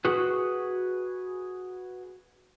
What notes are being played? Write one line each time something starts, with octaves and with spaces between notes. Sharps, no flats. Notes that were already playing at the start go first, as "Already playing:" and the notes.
F#4 G#4 B4